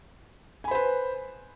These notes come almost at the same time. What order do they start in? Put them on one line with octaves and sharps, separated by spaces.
G#5 B5 C5 B4